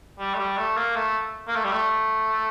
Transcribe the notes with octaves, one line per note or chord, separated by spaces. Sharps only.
G3
A3
G3
A3
A#3
A3
A#3
A3
G3
A3